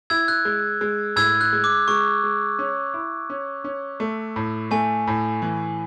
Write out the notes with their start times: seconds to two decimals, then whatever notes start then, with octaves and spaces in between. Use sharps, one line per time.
0.10 E4 E6 G#6
0.28 F#6
0.45 G#3
0.81 G#3
1.16 A2 E6 G#6
1.41 F#6
1.53 G#3
1.64 D6
1.88 G#3 C#6
2.23 G#3
2.59 C#4
2.94 E4
3.30 C#4
3.64 C#4
4.00 A3
4.36 A2
4.71 A3 G#5
5.07 A2
5.42 E3